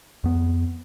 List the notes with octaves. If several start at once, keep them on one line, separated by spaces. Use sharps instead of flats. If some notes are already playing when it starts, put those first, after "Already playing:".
F2 B3